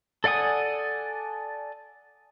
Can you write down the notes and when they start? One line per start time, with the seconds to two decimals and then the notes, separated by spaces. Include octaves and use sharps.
0.24 A4 D5 F#5 G#5 D#6